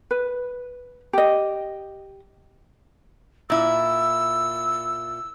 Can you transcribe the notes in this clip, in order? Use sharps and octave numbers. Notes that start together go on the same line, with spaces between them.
B4
G4 D#5
A#2 E4 E6